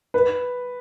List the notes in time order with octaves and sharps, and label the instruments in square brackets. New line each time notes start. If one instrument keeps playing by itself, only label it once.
[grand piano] B4